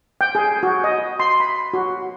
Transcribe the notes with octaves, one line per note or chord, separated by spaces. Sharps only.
G5
G#4
F#4
D#5
C6
B5
F#4